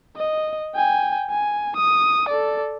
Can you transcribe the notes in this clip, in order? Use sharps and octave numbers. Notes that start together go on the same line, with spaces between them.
D#5
G5 G#5
G#5
D#6
A4 D5